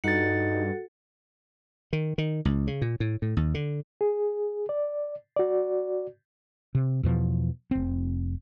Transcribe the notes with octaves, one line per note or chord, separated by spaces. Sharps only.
G2 D#4 F#4 A4 F#5 A6 C#7
D#3
D#3
C#2
C#3
A#2
A2
A2
D#2
D3
G#4
D5
F#4 D5
C3
E2 B2 F3
F1 C4